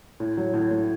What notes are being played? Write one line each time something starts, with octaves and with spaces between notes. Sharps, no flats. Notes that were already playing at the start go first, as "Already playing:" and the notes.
A2
F#3
A2
A2